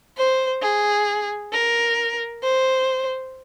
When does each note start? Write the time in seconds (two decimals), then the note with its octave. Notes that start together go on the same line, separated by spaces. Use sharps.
0.18 C5
0.62 G#4
1.53 A#4
2.43 C5